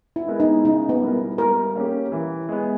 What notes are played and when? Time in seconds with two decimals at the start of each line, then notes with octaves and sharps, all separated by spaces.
0.16 E4
0.27 G#3 B3 E4 A#4
0.40 D#4
0.65 C#3 D#4
0.89 B3
1.01 G3 B3 E4 A#4
1.38 G3 A#4
1.75 A#3 C#4 G4
2.12 E3
2.49 G#3 B3